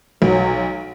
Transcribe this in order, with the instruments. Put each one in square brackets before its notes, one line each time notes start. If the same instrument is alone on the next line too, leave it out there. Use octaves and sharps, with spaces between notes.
[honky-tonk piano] B1 [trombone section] F#3